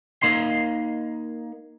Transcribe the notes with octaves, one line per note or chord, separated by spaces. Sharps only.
A#3 D#4 C6